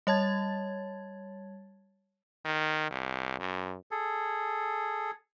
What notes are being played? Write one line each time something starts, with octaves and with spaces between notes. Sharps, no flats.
G3 C#5 A5 G#6 A6
D#3
C2
F#2
G#4 A4